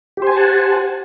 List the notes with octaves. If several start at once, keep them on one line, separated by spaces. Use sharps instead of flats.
G4 C5 F#5 G#5 A5